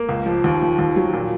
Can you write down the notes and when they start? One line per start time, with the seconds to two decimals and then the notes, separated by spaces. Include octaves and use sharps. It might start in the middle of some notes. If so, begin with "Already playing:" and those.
Already playing: A#3
0.09 C#2
0.26 F3
0.44 D#2
0.62 F3
0.79 D#2
0.96 F#3
1.13 A#2